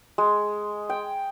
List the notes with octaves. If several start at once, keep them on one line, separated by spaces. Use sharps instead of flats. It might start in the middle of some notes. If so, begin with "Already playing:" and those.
G#3
G5